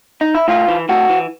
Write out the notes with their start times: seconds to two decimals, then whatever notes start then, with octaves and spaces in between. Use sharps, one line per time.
0.21 D#4
0.35 E4
0.48 A2 F4
0.68 E3
0.89 A2 F#4
1.10 E3